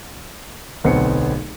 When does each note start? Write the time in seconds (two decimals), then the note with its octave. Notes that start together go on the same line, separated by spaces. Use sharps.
0.84 D1 B1 B3 C4 C#7